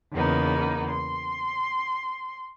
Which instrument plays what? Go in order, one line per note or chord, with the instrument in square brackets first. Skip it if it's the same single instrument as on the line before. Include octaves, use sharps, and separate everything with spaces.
[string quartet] E2 C#3 A#3 B3 D#4
C6